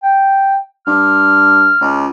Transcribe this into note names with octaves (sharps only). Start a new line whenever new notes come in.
G5
G2 F6
C#2